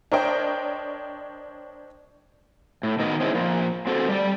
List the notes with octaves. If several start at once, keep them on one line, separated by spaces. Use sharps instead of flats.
D4 A#4 C5 C#5 D#5 G5
A2
D#3 B3 F#4 A#4 D#5
C4 C#4 D#4 E4 G#4
F3 A#3
C4 F#4 A4
G3 D5